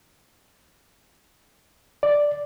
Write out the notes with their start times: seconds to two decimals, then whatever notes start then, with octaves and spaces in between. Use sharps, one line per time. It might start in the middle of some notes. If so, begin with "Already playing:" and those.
2.03 D5